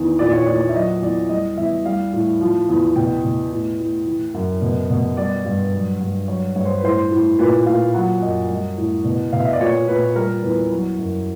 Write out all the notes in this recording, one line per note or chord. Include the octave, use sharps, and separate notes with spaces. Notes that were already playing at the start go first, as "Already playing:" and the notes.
Already playing: E2 D#3
A#2 D5
C#5
A#2 D5
D5
E5
F#3 D#5
E2 D5
G3 D#5
E2 E5
G3 F5
A2
F3
E2
B2 G5
B2
A2
A2
E3
F#2
B2
B2
G3 D5
G2
F#3
G2
F#3 C#5
G2 C#5
C5
B4
A2 C5
A2
A#2 B4
A#2 F5
F#3 F#5
F#2 D#5
G3 D#5
A2
B2
B2 F5
E5
D#5
D5
A#2 C#5
A#2 B4
G3 A#4
E2 B4
F#3
F#2